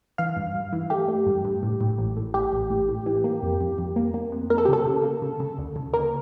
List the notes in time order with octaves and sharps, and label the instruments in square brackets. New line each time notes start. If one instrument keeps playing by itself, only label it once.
[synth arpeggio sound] E3 F5
G2
G2
E3
A3 G4
A3
G2
G2
A2
A2
A1
A2
A1 G4
A1
A2
A2
E3
A#3
F2
F2
F2
A#3
A#3
F2
A#3 A#4
A4
G4
C#3 A4
C#3
A#3
C#3
C#3
D2
C#3
A#3 A#4